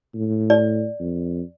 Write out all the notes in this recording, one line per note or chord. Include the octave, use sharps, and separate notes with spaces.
A2
D5
F2